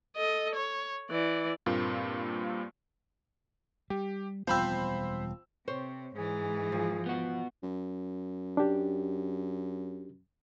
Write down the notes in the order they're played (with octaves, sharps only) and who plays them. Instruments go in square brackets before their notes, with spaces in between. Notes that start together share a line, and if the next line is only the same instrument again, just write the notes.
[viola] A4 D#5
C#5
E3 D5
[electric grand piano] G2 A#2 A#3 C4 F4
[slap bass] G3 [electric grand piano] G4
[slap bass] E1 G3 B3 [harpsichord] F3 C4 [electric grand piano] C5 B5 E6
[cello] C3 [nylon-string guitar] C5 C#5
[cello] G#2 E3 [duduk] G#4
[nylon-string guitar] F3
[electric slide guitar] B3 F#4
[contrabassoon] F#2
[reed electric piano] D4 G4